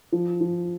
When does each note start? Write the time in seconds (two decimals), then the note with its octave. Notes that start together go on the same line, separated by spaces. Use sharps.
0.12 F3
0.41 F3